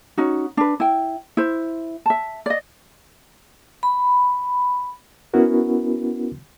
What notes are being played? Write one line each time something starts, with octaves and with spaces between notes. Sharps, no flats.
C#4 D#4 F#4
D4 B4
E4 G5
E4 C5
E5 A5
D5 D#5
B5
B3 C#4 E4 F#4 A#4